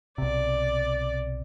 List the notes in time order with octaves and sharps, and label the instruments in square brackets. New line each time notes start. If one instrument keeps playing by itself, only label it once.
[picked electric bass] B1 C3 [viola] D5